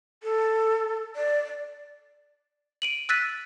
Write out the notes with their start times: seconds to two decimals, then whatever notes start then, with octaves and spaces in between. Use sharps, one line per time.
0.23 A4
1.16 D5
2.82 D7 D#7 F#7
3.09 E6 F#6 A6 B6 D#7